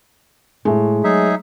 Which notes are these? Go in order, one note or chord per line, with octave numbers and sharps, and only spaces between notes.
A2 G#3 A3
F#3 D#4 G#4 E5